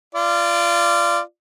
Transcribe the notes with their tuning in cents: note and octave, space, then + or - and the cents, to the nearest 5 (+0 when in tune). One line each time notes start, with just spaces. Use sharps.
F4 -25 D5 +0